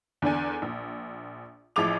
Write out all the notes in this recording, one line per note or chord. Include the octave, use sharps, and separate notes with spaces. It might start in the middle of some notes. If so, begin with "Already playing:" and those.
E2 D3 D4 G#5
A#1
A1 F3 E4 G#4 D6 F7